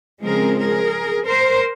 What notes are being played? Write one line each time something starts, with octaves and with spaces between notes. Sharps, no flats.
C#3 F3 G#3 C4 G#4 A#4
G#4 A#4
A#4 C5